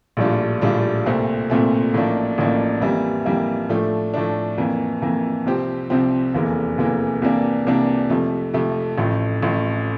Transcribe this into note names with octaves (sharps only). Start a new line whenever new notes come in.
A#1 A2 G3 D4 F4
A#1 A2 G3 D4 F4
C2 A#2 A3 C4
C2 A#2 A3 C4
A1 A2 F3 A#3 D4
A1 A2 F3 A#3 D4
F2 E3 G3 A#3 E4
F2 E3 G3 A#3 E4
A2 F3 A3 D4
A2 F3 A3 D4
F2 E3 A#3
F2 E3 A#3
C2 C3 F3 C4 G4
C2 C3 F3 C4 G4
F1 E2 E3 A#3
F1 E2 E3 A#3
C2 C3 E3 A#3 D4
C2 C3 E3 A#3 D4
F2 C3 F3 A3
F2 C3 F3 A3
A1 A2 F3
A1 A2 F3